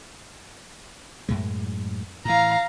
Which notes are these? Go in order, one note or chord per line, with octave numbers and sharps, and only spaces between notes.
F#2 A2 G#3
A2 E3 F5 A#5